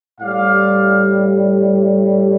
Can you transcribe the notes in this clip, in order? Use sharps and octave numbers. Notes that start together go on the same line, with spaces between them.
A2 G3 D5 F5